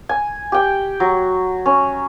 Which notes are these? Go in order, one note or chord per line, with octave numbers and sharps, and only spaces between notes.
G#5
G4 G5
F#3
C#4